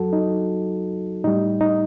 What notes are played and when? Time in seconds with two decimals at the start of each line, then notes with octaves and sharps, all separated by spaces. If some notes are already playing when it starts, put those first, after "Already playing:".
Already playing: F#2 F#3 F#4 A4
0.13 D#4
1.24 A2 G3 D#4
1.61 D#4